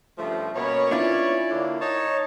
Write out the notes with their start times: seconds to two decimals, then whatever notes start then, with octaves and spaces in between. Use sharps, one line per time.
0.18 G2 C#3 F3 A3
0.56 B2 A#3 B3 C#4 B4 C#5
0.91 D4 E4 F4 D5
1.50 D3 A#3
1.81 D#4 C#5 A5